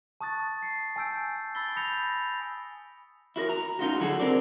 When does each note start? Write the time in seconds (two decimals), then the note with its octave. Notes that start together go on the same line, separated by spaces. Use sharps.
0.21 A5 C#6 D#6 F#6 A6
0.62 C7 C#7
0.96 G#5 A5 E6 G6 D7
1.55 B5 E6 A6 B6 G7
1.76 B5 D#6 G6 A#6 C#7 F7
3.36 E4 F#4 A#4
3.50 A#5
3.79 C#4 D#4 F4 F#4
4.00 D3 F#3 F#4 G#4 A4
4.20 C4 A#4 D5